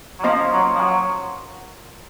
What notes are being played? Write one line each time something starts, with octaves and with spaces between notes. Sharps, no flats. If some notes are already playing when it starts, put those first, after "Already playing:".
F#3
F3 A#3 C#4 F4 C5 D#5
F#3
F3
F#3